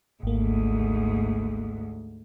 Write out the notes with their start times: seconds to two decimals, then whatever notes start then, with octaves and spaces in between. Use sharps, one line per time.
0.23 G#1 D2 G#2 A#3